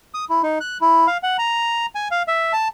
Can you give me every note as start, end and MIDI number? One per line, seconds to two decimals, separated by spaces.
0.14 0.25 87
0.29 0.42 64
0.43 0.59 63
0.60 0.78 90
0.81 1.07 64
1.07 1.17 77
1.23 1.37 78
1.39 1.86 82
1.95 2.08 80
2.11 2.23 77
2.28 2.53 76
2.53 2.68 81